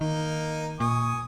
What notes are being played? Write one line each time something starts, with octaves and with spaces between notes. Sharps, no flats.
D#3 A#3 D#4
A#2 G#5 C#6 D#6